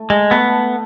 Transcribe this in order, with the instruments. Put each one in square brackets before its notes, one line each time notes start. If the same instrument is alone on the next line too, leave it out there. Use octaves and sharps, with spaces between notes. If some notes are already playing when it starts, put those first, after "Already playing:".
Already playing: [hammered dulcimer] A3
[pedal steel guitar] G#3
[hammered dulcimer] A3 [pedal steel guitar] B3